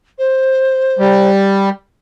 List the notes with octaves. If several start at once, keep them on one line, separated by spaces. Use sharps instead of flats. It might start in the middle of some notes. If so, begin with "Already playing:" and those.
C5
G3